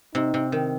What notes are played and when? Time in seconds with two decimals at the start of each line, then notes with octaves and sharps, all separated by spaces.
0.15 C3 D#4
0.34 C3
0.52 D#3